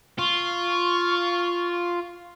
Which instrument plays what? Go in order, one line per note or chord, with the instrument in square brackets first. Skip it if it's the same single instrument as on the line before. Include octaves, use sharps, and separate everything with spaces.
[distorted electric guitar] F4 [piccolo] C#6